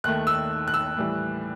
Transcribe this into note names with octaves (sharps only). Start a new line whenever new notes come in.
D#2 D#3 A3 F#6
E6
F#6
E6
A2 E3 G3